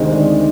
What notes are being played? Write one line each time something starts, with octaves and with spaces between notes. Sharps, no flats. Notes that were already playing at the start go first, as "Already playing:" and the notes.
Already playing: D2 C3 D#3 G#3 C4 D#5
D5